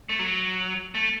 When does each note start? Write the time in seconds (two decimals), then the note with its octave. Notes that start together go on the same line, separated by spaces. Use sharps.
0.09 A3
0.19 F#3
0.95 A3